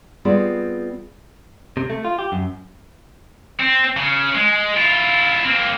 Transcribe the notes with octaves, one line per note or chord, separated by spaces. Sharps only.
G3 B3 C4 F4 G#4
C3
A3
F4
G4
F#2
C4
C#3
G#3
E4 F4
A#3 C4